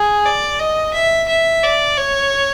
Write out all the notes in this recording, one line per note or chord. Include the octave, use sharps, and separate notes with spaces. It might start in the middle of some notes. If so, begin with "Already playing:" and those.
Already playing: G#4
D5
D#5
E5
E5
D5
C#5